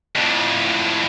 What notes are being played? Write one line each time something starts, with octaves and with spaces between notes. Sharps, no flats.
F2 A2